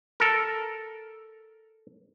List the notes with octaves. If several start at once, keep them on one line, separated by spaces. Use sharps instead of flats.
A4 A#4